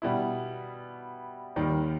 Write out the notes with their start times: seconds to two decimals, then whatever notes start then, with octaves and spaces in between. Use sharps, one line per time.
0.02 B2 G3 B3 E4
1.56 D#2 D#3 G3